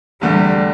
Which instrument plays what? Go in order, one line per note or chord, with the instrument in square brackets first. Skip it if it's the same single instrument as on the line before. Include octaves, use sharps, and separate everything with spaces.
[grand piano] E2 D3 A3 [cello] G3